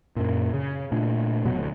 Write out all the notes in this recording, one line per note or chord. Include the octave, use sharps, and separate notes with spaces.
F#2 A#2
C#3
A#2 A3 D4
F1 B2 F#3 B3
D2